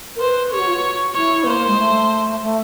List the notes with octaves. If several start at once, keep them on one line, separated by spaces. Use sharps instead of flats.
A#4
B4 C5
G4 C#5
F#4
F4
F#4
E4 C#5
B3
A#3 C5
G#3
A3
A3